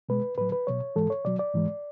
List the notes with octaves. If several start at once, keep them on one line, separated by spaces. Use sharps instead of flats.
B2 G#3 B4
A2 F#3 B4
B4
B2 F#3 C#5
G#2 E3 G#3 A4
C#5
B2 F#3 D5
D5
G#2 E3 G#3